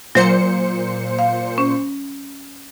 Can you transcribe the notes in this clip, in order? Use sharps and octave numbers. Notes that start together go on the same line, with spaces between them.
A#2 F#3 C5 C#7
F5
C#4